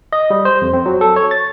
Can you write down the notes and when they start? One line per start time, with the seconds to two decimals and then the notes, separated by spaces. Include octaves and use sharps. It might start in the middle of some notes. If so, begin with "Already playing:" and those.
0.13 D#5
0.30 G3
0.45 C5
0.62 F2
0.73 C4
0.86 F#3
1.01 A4
1.16 C#5
1.31 A6